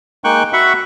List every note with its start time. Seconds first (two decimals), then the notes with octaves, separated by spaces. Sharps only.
0.24 G#3 A#3 D#4 G5 C#6 F#6
0.53 F#4 E5 F#5 B5 C#6